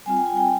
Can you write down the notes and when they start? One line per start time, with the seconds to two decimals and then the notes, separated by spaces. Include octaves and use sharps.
0.06 G3 C4 F4 G#5
0.17 G5
0.26 G#5
0.37 G5